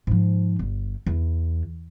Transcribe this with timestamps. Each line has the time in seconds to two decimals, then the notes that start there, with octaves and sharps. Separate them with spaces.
0.07 G#2 F3
0.59 G1
1.06 E2